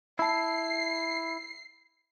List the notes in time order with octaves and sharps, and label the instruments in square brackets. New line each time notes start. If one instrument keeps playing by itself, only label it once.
[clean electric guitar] E4 A5 [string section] C7